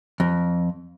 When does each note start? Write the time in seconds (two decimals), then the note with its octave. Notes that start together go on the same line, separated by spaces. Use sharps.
0.20 F2